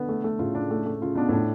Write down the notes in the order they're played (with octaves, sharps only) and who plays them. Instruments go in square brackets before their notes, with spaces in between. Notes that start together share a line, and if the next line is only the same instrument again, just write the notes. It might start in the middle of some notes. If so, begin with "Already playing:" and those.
Already playing: [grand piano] B2 D3 [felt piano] B3
[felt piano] A3
A3
[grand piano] A2 C#3 [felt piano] F4
[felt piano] D4
A3
A3
[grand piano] C#3 [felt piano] F4
[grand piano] B2 [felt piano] D4
[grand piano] A2 [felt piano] D4